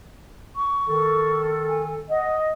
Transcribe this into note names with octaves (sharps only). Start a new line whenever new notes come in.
C#6
D#3 A4
G#5
D#5 F#5